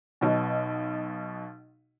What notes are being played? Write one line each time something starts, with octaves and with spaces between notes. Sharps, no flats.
B1 B2